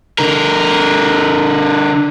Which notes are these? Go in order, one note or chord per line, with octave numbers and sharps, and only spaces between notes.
D3 A#4